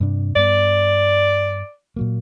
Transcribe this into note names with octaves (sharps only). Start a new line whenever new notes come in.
G2 C3 D4
G2 B3 D5
A#2 F#3 A#3